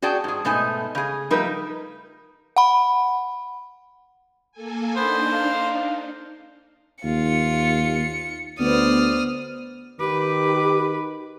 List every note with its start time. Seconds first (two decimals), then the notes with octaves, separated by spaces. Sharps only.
0.02 F#4 G#4 D5 G5 A5
0.24 G#2 G#4
0.45 G#2 B2 A3 D#4 G#5
0.95 C#3 G#4
1.30 F3 G3 A3 D#4 A#4 B4
2.56 F#5 B5
4.52 A#3 A4 G#5
4.96 B3 D4 D#4 C5
5.32 F5
7.04 D#2 F4 C#7
8.59 D2 B3 C5 D5 D#6 F6
10.00 D#3 G4 B4 D6